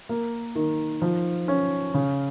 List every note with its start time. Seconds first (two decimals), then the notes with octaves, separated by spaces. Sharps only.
0.09 A#3
0.55 D#3
1.02 F3
1.48 C#4
1.94 C#3